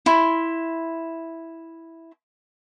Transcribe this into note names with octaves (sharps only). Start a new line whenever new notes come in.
E4 C6